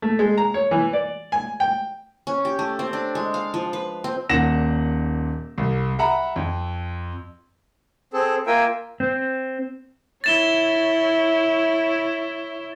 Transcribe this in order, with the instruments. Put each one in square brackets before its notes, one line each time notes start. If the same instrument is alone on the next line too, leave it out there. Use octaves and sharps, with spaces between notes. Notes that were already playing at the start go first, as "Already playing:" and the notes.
[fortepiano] A3
G#3
A#5
C#5
E3
D5
G#5
G5
[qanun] C#4
G4
A3
C4
D4
G#3
F5
F3
B4
C4
[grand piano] D#1 A#2 F#5 A#6 E7
C2
E5 F#5 A#5 B5
F2
[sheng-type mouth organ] C4 G#4 A4
A#3 F4 A#4 E5 G5 G#5
[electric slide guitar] C4
[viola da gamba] E4 C#5 [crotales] A6 E7 G7